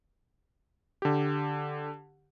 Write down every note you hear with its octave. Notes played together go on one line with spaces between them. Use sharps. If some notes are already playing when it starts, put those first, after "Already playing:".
D3 G4